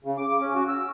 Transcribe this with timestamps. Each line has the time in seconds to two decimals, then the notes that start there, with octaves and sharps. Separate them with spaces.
0.04 C#3
0.18 D6
0.40 C#4
0.55 F#4
0.68 E6